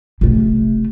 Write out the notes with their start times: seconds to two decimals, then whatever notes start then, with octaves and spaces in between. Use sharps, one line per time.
0.21 C3 A3